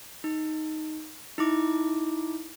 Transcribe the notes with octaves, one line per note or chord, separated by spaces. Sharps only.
D#4
D#4 E4 D6